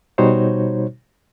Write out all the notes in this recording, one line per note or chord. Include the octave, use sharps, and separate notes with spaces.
B2 G3 D#4 F#4 C5 C#5